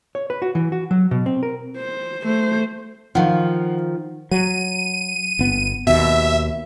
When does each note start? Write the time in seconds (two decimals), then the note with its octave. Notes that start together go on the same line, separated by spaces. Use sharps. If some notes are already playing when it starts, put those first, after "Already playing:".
0.15 C#5
0.30 B4
0.42 F#4
0.55 E3
0.72 F#4
0.91 F#3
1.11 B2
1.26 C4
1.43 A#4
1.77 C5
2.25 A3 C5
3.15 D#3 F3 F5 F#5
4.31 F#3 D#7
5.39 G1 B3
5.87 D#2 B2 E5